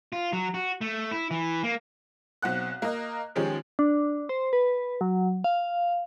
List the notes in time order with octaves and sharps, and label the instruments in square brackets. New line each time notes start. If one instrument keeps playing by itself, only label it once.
[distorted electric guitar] F4
F#3
F#4
A3
E4
E3
A#3
[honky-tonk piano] B1 C4 F#5 F#6
A#3 D#5
D#3 F3 G#3 C#4 G4
[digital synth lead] D4
C5
B4
F#3
F5